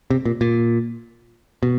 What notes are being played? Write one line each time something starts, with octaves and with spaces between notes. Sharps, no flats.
C3
A#2
A#2
B2